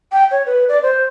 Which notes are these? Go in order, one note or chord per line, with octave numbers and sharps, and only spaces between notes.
G5
C#5
B4
D5
C5